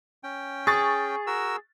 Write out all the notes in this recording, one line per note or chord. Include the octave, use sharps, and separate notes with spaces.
C#4 G5
G#4 C#6 A6
F#4 A#4 E6